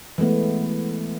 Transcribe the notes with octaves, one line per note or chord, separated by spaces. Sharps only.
E3 G#3 A3 B3